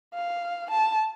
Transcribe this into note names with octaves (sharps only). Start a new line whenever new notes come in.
F5
A5